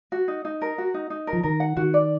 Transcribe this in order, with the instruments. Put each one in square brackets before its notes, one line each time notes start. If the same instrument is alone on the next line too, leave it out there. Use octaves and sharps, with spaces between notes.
[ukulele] F#4
D#4
D#4
A#4
F#4
D#4
D#4
A#4
[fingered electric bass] F3
[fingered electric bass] D#3 [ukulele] A#4
[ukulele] F#5
[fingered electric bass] D#3 [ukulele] F#4
[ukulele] D5